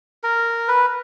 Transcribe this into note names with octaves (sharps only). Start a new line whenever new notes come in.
A#4
B4